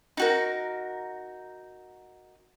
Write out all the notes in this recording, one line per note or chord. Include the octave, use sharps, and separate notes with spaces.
D#4 F#4 A#4